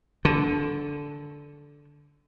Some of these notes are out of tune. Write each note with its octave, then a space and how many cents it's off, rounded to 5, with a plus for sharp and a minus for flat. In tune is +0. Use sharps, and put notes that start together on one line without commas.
D3 -10